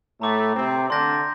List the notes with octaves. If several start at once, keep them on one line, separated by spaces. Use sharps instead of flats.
A2 A3 A#5 D6 A6
C3 C4
D3 D4 C6 G6 A#6